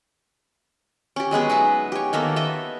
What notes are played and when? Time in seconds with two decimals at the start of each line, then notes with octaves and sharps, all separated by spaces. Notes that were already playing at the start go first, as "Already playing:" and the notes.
1.16 C#4 G4
1.31 F#3 G#3 B3 G#4
1.50 D#4 B4 E5
1.92 G4 C#5
2.13 D#3 A#3 B3 A4
2.36 D#5 E5